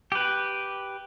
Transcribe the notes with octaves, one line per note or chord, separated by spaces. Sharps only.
G4 B4